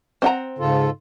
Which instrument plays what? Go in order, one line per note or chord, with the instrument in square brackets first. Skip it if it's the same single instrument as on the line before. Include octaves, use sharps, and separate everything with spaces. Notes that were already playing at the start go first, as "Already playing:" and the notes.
[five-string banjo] C4 F#5 A#5
[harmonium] G#2 F4 A4 [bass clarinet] C#3